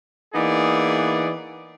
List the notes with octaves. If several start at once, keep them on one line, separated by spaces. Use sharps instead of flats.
E3 A#3 B3 D#4 G#4 D5